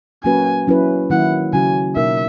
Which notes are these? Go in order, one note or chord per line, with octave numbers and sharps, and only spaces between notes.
F#3 A#3 C#4 F#4 B4 G#5
F#3 C#4 E4 B4
D#3 F#3 A#3 E4 F#5
C#3 F#3 C#4 F#4 G#5
B2 A#3 D#4 A#4 E5